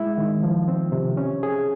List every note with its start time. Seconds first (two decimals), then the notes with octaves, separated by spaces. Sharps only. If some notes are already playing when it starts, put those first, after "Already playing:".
Already playing: G#3 E4
0.18 D#3
0.43 F3
0.68 C4
0.92 C3
1.17 C#4
1.43 G#4